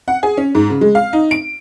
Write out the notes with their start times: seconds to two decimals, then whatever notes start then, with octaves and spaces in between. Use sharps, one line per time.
0.08 F#5
0.23 G#4
0.37 C#4
0.55 G#2
0.70 C#3
0.81 G#3
0.95 F5
1.13 D#4
1.31 D7